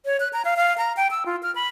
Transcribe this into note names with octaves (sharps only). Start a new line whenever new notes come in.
C#5
F#6
A#5
F5
F5
A#5
G5
E6
F4
F6
B5